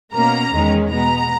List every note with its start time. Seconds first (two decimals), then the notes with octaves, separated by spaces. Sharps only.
0.14 B2 A#3 C#4 A#5
0.52 E2 D#3 G#3 C#4
0.90 B2 G#3 B3 A#5